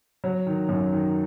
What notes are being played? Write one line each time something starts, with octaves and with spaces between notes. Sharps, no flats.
F#3
D#3
F#2
D#3